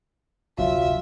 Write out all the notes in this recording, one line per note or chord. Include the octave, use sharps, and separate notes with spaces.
F1 D2 F#3 D4 F4 E5